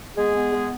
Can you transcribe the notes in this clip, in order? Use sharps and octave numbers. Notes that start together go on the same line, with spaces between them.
G#3 B3 G#4
B3
G#3